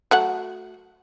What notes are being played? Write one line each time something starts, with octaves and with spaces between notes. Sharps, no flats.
F#3 A3 F#5